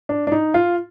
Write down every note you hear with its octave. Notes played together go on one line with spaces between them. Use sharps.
D4
D4
D#4
F4